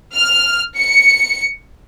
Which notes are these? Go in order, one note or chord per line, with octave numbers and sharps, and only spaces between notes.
F6
C#7